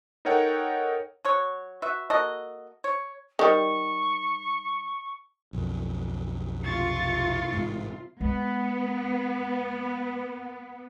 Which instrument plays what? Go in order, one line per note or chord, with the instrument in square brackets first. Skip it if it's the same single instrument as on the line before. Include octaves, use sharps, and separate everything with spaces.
[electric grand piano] D#4 A4 A#4 C#5 F#5 G5
[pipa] F#3 C#5
F#4 B4 E5
A#3 F#4 A4 D#5
C#5
[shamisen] D#3 G3 [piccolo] C#6
[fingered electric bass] B1 F2
[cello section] C3 E4 F4 [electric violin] C#6 A6
[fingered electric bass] A1 G#2
[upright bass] G#3 [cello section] B3